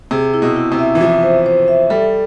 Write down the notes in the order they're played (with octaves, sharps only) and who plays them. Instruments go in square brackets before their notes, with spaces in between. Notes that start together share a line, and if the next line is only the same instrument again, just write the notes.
[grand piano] C3 [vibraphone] G#4
[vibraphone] E4
[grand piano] B2
[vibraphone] E4
[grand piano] C3
[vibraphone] E5
[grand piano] E3
[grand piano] F3 [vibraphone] E5
[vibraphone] C5
C5
E5
[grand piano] G3 [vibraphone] A4